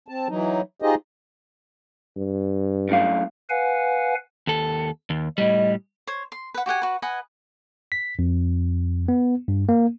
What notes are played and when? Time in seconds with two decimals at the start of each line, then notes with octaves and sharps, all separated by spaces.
0.08 C4 A5
0.29 E3 F#3 D#4
0.82 D#4 F4 G4 G#4 C5 D#5
2.16 G2
2.89 F#2 A2 F5
3.50 B4 F5 F#5 G#5
4.47 D#2 A4
5.10 D#2
5.38 A2 G3 D#5
6.07 C5 C#5
6.32 C6
6.54 B4 F#5
6.66 F#4 G4 F#5 G#5
6.82 F#4 B4
7.02 B4 D#5 F#5 G#5
7.92 B6
8.19 F2
9.08 B3
9.48 G2
9.69 A#3